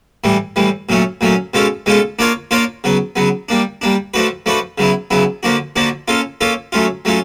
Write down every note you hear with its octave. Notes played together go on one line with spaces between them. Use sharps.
A2 E3 G3
A2 E3 G3
A#2 F#3 A3 C#4
A#2 F#3 A3 C#4
B2 G#3 C#4 F4 A4
B2 G#3 C#4 F4 A4
A#3 D4 F4 A#4 C#5
A#3 D4 F4 A#4 C#5
C#3 F#3 B3
C#3 F#3 B3
G3 A#3 D4
G3 A#3 D4
F3 A3 D4 F#4 B4
F3 A3 D4 F#4 B4
C#3 F#3 B3 E4
C#3 F#3 B3 E4
D3 F3 A#3 D4 F#4
D3 F3 A#3 D4 F#4
A#3 C#4 F4 A4
A#3 C#4 F4 A4
F#3 A3 C#4 F4
F#3 A3 C#4 F4